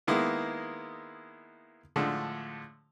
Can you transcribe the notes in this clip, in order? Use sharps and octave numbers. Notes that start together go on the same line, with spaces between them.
D#3 G#3 A#3 B3 E4
A2 D3 F3 G#3 A3